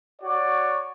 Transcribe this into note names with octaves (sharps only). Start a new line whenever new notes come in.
F#4 C#5 D5